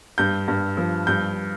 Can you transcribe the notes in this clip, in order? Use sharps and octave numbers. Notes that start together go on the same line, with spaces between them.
G2 G6
G2
F3
G2 G6